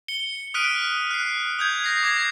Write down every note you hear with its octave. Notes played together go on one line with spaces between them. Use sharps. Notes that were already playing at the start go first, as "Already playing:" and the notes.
C#7 G7
D#6 F6 F#6 B6 D7 D#7
F#6 C7
D#6 G6 G#6
A#6 C7
D6 G#6 A#6 C7